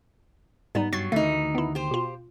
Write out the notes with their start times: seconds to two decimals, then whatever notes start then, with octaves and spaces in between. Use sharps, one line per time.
0.75 G#2 G3 B3 D#4
0.93 G2 F#3 C#6 A6 C7
1.12 D2 D#3 E3 A3 D#4
1.55 B3 E4
1.75 G4 C5
1.91 B2 F4